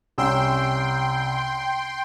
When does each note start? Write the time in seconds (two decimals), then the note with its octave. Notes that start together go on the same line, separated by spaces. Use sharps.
0.18 C2 C#4 G5 C6 E6